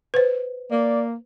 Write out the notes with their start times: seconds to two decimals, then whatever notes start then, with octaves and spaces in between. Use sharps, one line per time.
0.14 B4 C5
0.71 A#3 D5